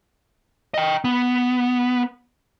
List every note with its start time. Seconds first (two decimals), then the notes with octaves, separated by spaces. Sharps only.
0.74 D#5 G5
1.04 B3